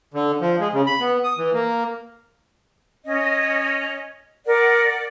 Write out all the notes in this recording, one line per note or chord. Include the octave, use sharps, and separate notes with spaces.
D3
F3
G#3
C#3
B5
B3
D#6
E3
A#3
C#4 D#5
A#4 D5 F#5